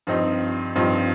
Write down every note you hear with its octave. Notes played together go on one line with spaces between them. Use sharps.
G2 F3 C4 D#4
G2 F3 C4 D#4